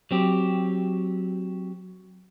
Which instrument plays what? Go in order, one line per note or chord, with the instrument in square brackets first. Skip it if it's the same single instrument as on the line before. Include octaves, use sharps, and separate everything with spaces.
[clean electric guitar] F#3 C4 G4